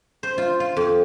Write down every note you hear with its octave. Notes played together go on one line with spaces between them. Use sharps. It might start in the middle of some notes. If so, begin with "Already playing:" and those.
C5
F4
F4
F2